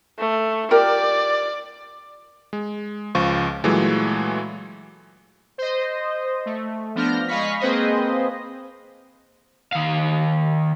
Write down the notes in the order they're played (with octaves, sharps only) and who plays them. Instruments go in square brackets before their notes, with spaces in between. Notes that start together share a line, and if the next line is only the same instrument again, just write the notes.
[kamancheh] A3
[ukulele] F4 G4 A#4 [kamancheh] D5
[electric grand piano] G#3
C#2 F3 F4 C#6
A#2 E3 F#3 G#3 A3
[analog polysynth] C5 D#5
A3
F3 B3 D4 F6 G6 A#6
G#3 D#5 F5 B5 C#6 B6
A#3 C4 G#4 B4 C5 D#5
[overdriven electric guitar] D#3 F5